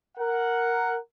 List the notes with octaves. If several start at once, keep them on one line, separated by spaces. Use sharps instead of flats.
A#4 F#5